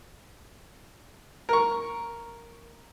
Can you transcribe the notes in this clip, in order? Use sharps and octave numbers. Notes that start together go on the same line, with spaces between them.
A#4 C#6